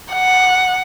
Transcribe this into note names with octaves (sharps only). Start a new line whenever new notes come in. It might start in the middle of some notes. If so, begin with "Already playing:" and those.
F#5